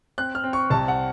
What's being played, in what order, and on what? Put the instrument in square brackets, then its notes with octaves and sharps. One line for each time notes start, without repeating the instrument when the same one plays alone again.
[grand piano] C4 F#6
F6
C4
C#6
C2 A5
F#5